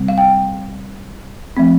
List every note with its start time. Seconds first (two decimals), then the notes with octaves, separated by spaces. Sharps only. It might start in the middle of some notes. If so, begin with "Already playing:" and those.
Already playing: C3 G3 C4
0.08 F5
0.18 G5
1.57 F3 A3 C4